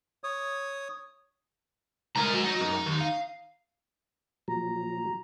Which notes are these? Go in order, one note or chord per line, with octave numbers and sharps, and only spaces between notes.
C#5 D#6
C2 G#3 A#4 A#5
F#3
D#4
F#2
D#2
F5
A#2 F3 F#3 A#5